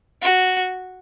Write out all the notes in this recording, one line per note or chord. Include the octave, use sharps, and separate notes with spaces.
F#4